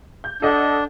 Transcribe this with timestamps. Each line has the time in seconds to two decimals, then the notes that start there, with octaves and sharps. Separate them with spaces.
0.24 G6
0.42 D4 A4 D#5 F#5